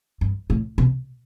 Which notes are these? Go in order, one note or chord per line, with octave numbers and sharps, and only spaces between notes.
G2
A2
B2